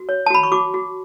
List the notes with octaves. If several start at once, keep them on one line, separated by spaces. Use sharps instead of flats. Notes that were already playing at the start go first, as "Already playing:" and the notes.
Already playing: F#4
C#5
A5
F#4 B5
C#6
F#4 D6
F#4